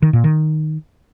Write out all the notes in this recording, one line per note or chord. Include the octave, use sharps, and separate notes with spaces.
D#3
A#2
D#3